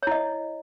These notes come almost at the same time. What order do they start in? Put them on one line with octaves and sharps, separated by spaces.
C#5 E4 D#5